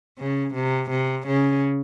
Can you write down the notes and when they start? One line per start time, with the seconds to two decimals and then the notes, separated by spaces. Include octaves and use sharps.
0.19 C#3
0.54 C3
0.90 C3
1.27 C#3